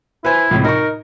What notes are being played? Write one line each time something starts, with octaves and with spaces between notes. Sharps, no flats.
E4 B4 C5 G#5
C#2 A2 C3
D#4 A#4 C#6